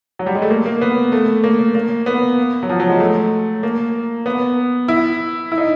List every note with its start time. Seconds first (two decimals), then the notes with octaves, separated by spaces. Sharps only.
0.19 F#3
0.26 G3
0.35 G#3
0.42 A3
0.50 A#3
0.66 A#3
0.81 B3
1.12 A3
1.44 A#3
1.75 A#3
2.06 B3
2.63 F#3
2.69 F3
2.80 F#3
2.89 G#3
3.00 A3
3.63 A#3
4.26 B3
4.88 E4
5.52 E4
5.58 D#4